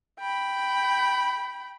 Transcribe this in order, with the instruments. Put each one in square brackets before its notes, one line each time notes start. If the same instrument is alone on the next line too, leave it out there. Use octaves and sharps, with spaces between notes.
[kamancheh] G5 B5